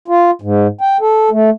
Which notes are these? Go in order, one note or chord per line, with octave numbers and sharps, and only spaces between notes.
F4
G#2
G5
A4
A3